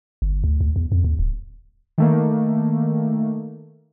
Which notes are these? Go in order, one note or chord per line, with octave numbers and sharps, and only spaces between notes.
G1
D2
D2
E2
F2
D#2
D1
D#3 A3 A#3